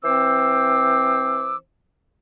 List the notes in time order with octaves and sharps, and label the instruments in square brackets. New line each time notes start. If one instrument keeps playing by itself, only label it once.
[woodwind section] E3 C4 C5 D6 E6